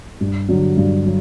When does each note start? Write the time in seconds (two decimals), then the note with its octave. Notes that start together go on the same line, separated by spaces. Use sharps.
0.21 G2
0.49 D3 F#3
0.77 G2
1.06 F#3